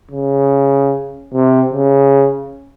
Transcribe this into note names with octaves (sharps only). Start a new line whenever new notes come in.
C#3
C3
C#3